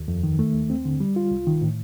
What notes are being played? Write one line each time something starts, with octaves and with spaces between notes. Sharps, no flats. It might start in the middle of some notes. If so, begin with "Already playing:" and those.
Already playing: D#2
F2
D#3
A3
D#2
C4
D3
G3
F4
C2
D#3
A2